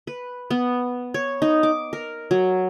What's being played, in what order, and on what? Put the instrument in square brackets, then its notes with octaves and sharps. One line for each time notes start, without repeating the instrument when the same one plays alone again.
[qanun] B4
B3
C#5
D#4
D6
A#4
F#3